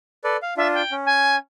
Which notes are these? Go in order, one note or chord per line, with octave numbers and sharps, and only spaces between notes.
A4 B4 D5
F5
D4 F4 E5
G5
C#4
G#5